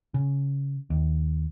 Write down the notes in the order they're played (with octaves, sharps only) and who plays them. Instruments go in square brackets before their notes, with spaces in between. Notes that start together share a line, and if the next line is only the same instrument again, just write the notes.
[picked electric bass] C#3
D#2